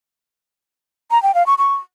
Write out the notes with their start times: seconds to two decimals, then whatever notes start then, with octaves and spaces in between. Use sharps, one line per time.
1.11 A#5
1.23 G5
1.35 F5
1.46 C#6
1.58 C#6